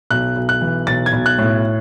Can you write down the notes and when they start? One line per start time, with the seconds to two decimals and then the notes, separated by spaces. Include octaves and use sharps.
0.10 B1 F#6
0.36 B1
0.49 F#6
0.62 E3
0.87 B1 A6
1.06 G#6
1.13 B1
1.26 F#6
1.38 A2